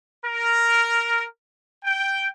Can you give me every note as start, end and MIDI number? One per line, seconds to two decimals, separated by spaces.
0.23 1.24 70
1.84 2.27 79